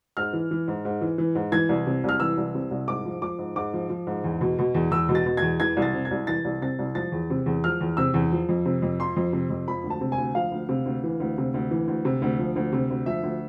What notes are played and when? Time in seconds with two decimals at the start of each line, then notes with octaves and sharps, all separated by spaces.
0.17 G#2 F6
0.33 E3
0.51 E3
0.68 G#2
0.85 G#2
1.01 E3
1.18 E3
1.35 G#2
1.52 E3 G#6
1.69 C2
1.87 C3
2.04 C2 F6
2.20 E3 E6
2.38 C2
2.55 C3
2.71 C2
2.88 G#2 D6
3.05 F3
3.22 F3 D6
3.39 G#2
3.56 G#2 D6
3.74 F3
3.89 F3
4.07 G#2
4.24 E2
4.41 B2
4.59 B2
4.75 E2
4.91 E2 E6
5.09 B2
5.15 A6
5.26 B2
5.37 E2 G#6
5.60 E3 G#6
5.77 C2
5.82 A6
5.94 C3
6.05 G#6
6.11 C2
6.27 E3 A6
6.45 C2
6.62 C3 A6
6.79 C2
6.95 F3 A6
7.12 E2
7.30 C3
7.46 E2
7.64 F3 F6
7.81 E2
7.97 C3 E6
8.14 E2
8.32 F3
8.49 F2
8.65 C3
8.82 F2
9.00 F3 C6
9.16 F2
9.33 C3
9.50 F2
9.68 F3 B5
9.84 D2
9.90 A5
10.01 C3
10.12 G#5
10.18 D2
10.35 F3 F5
10.52 D2
10.69 C3
10.86 D2
11.04 E3
11.20 D2
11.38 C3
11.54 D2
11.71 E3
11.88 D2
12.05 C3
12.22 D2
12.39 F3
12.56 D2
12.72 C3
12.90 D2
13.06 F3 E5
13.23 D2